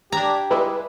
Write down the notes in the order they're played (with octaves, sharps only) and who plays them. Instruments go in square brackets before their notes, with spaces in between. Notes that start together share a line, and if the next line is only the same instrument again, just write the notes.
[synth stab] D4 G#6 B6 [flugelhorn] G4 [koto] A#5
[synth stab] G3 G#3 E4 [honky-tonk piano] B4